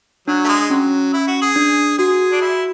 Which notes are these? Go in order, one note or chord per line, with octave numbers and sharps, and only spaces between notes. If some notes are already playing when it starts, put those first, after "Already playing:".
F#3 D4
A3
G#3
F#3 C#4
E4
F#4
G#4
D4
F#4 G#4
D4
E4